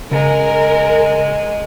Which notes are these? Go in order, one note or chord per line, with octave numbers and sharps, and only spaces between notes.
C#3 G#3 A#4